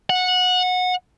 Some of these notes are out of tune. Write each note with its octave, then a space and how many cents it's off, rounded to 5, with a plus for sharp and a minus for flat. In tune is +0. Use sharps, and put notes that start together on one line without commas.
F#5 -20